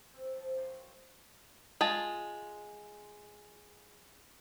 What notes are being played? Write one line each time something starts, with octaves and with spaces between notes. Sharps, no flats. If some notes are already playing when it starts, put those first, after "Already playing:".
C4
F3
F#2 G5 C6
G#3 F4 A5